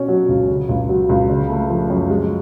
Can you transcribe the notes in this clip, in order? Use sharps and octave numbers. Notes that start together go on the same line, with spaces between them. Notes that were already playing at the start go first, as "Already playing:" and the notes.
Already playing: B2 C#4
F#3
C#2
C#3
C#2
F#3
C#2
C#3
A3
F3
F#2
G#3